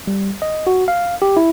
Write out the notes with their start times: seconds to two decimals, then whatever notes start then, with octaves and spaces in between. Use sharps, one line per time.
0.07 G3
0.42 D#5
0.67 F#4
0.88 F5
1.22 G4
1.37 E4